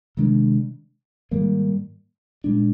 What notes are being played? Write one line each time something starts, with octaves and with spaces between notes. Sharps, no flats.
C3 D#3 G#3 D4
G#2 D#3 G3 A#3
A#2 G#3 D4